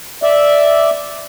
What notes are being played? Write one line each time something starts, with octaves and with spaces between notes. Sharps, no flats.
D5 E5